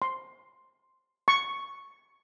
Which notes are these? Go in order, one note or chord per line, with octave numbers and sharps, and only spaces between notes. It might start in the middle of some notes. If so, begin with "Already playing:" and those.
C6
C#6